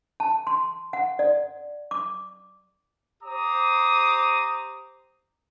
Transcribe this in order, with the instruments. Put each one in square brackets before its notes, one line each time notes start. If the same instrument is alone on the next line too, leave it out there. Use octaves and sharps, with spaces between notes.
[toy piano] A5
C6
F#5
D5
D6
[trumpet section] G4 C5 A#5 D6 D#6